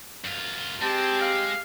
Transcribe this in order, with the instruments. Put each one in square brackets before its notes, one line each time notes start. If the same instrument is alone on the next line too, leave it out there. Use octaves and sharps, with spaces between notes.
[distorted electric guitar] F#2 F4
[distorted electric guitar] G#3 [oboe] C4 [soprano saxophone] G4 [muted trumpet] A5
[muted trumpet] F5